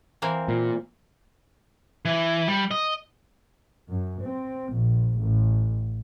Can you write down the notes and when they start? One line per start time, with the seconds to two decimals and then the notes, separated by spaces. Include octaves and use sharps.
0.22 E3 A#3 C4
0.48 A#2
2.05 E3
2.48 G3
2.71 D#5
3.89 F#2
4.23 C4
4.74 A#1
5.20 A1